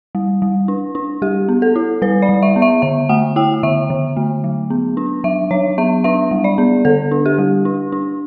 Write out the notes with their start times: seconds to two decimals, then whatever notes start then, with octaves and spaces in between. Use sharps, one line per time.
0.15 G3
0.42 G3
0.68 D4
0.95 D4
1.22 G3 G4
1.49 B3
1.62 A4
1.76 E4
2.02 G3 B4
2.22 D5
2.29 G3
2.43 E5
2.56 B3
2.62 E5
2.82 D3 E5
3.09 A3 F#5
3.36 E4 G5
3.63 D3 E5
3.90 D3
4.17 A3
4.44 F#3
4.70 B3
4.97 D4
5.24 F#3 E5
5.51 F#3 C#5
5.78 B3 E5
6.04 D4 E5
6.31 G3
6.44 D5
6.58 B3
6.85 D3 A4
7.11 D4
7.26 G4
7.38 G3
7.65 D4
7.92 D4